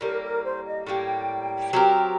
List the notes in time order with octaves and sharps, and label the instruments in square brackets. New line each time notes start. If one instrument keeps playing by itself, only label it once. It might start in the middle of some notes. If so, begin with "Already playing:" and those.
[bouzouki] A2 G3 A#3 [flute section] A#4
[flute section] A#4
C5
D#5
[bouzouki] A2 G3 A#3 [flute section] G5
[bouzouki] F#3 C4 G4 A#4